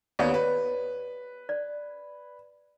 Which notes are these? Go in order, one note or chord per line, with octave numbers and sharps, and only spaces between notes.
D#2 B3 G4 C#5 D5
B4
D5